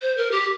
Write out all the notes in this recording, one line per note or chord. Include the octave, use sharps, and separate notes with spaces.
C5
A#4
G4